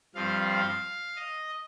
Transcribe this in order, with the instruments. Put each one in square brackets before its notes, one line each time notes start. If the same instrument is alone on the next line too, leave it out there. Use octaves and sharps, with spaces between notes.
[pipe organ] G2 F3 C4 F4 F5
F5
D#5